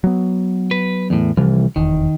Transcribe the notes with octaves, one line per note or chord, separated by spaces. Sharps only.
F#3 B3
B4
E2 A2
C2 E3 F3
F1 E2 D#3